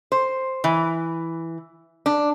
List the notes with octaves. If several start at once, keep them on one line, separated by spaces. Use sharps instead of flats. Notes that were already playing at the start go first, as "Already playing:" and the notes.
C5
E3
D4